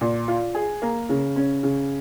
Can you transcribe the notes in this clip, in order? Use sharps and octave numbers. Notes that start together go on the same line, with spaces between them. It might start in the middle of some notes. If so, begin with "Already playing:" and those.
A#2
F4
G#4
A#3
C#3
C#4
C#3